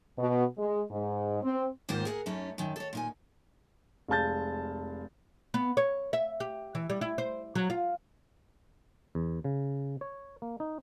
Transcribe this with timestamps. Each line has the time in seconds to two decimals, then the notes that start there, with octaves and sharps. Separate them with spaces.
0.18 B2
0.58 G#3
0.91 G#2
1.43 C4
1.89 D#2 G#2 D#3 F4 C5
2.05 G#4 A#4 F#5
2.26 F#2 A3 C#4 D#4 A4
2.58 F#2 D#3
2.76 A4 C#5
2.93 A#2 D#4 G#5
4.08 F1 G#3 F5 A5 G6 A6
5.54 B3
5.77 C#5
6.13 E5
6.40 G4
6.75 E3
6.90 G3
7.01 E4
7.18 C5
7.55 F#3
7.70 F4
9.15 E2
9.44 C#3
10.01 C#5
10.42 A#3
10.60 D#4